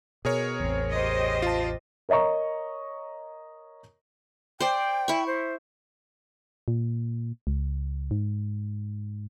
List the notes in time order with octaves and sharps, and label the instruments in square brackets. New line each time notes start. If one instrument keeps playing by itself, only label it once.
[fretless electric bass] B2 [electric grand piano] G#4 A#4 C#5
[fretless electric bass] A1 E2 [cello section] C4
[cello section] G4 C5 D#5
[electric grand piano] F4 A5
[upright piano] A#4 C#5 D#5 A#5 C#6
[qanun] C5 D5 [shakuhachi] G5
[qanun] E4 C#6
[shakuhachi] C5
[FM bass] A#2
C#2
G#2